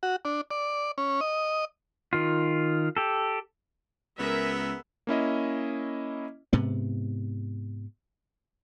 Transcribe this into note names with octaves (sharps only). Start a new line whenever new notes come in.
F#4
D4
D5
C#4
D#5
D#3 F4
G4 A4
C#2 B3 G#4 A#4 E5
A#3 C#4 E4 D#5
G#2 C3 B3